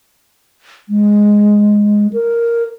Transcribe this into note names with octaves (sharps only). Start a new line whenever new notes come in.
G#3
A#4